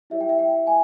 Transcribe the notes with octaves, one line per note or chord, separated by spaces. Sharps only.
E4 G4 C#5 E5
G5
E5
G5
G#5